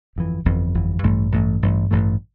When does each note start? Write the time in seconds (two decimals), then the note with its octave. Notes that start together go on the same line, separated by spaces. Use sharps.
0.16 G1 F2 E3
0.45 G1 F2 E3
0.74 G1 F2 E3
1.03 A1 G2 E3 A3
1.32 A1 G2 E3 A3
1.62 A1 G2 E3 A3
1.91 A1 G2 E3 A3